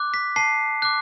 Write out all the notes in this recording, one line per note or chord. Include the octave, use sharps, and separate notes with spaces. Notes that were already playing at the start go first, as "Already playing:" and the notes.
Already playing: D6 F#6
B6
A5 C7
D6 F#6